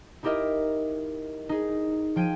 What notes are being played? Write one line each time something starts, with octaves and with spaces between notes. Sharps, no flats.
D#4 E4 G4 A#4 D#5 E5
D#4 G#4
F3 G5 G#6 D#7